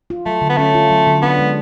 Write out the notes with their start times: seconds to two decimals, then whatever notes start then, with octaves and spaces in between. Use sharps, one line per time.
0.10 F4
0.26 F#3 A3
0.42 D3
0.49 B3
0.57 A3 C#4
0.75 F4
0.91 F#3
1.07 D3
1.22 B3 D4
1.39 G#3